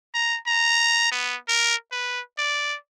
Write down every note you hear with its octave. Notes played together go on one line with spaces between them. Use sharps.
A#5
A#5
B3
A#4
B4
D5